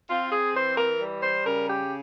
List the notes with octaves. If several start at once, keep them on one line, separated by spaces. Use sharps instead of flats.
C4 F4
G#4
E3 C5
A#4
G3
C5
C#3 A#4
G4